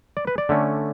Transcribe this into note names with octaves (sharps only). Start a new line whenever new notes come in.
D5
B4
D5
D3 A3 C#4